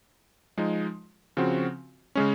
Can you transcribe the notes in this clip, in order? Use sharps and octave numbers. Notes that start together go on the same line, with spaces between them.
F3 G#3 D#4
C#3 F3 C4 F#4
C#3 G#3 C#4